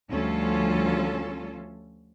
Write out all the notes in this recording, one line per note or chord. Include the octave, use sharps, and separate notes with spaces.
D2 F3 G3 C#4 F4 A4